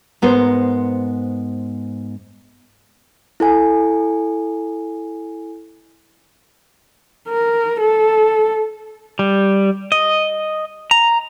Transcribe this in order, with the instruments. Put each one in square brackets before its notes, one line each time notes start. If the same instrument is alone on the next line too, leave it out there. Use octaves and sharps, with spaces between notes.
[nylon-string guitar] G#2 B3 A#4 C5
[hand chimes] E4 A4 G#5
[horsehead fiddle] A#4
A4
[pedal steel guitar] G3
D#5
A#5